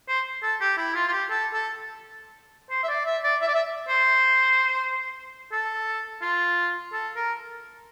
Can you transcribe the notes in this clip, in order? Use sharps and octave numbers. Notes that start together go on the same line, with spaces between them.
C5
A4
G4
E4
F4
F4
G4
A4
A4
C5
E5
D5
E5
D5
E5
D5
E5
C5
A4
F4
A4
A#4